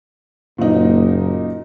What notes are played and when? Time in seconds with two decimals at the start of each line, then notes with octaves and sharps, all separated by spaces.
0.58 F#1 A#2 D#4